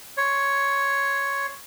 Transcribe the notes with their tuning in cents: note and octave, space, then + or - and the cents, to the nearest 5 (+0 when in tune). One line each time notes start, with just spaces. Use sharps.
C#5 +5 C6 +0